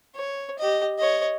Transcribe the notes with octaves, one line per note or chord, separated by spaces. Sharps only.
C#5
G4 D#5
C#5 D#5